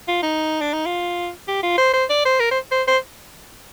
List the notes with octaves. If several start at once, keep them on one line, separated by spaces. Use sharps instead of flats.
F4
D#4
D4
D#4
F4
G4
F4
C5
C5
D5
C5
A#4
C5
C5
C5